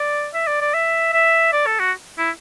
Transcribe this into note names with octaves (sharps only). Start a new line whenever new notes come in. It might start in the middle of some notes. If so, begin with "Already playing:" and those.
Already playing: D5
E5
D5
D5
E5
E5
D5
A4
F#4
E4